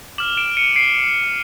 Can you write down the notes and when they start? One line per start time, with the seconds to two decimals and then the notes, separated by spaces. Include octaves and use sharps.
0.18 D6 F6 E7 F#7
0.37 D7 E7
0.57 C#7 D#7
0.76 C7 D7